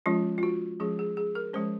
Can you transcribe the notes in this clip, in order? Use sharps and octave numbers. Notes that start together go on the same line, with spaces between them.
F3 G#3 C#4 F4
F4
F#4
F3 G#3 C#4 G#4
G#4
G#4
A#4
F3 G#3 C#4 C5